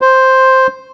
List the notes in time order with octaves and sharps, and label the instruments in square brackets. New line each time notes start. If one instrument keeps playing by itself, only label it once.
[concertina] C5